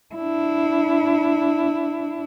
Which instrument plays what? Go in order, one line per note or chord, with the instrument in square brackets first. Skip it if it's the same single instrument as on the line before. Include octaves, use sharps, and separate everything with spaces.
[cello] D4 E4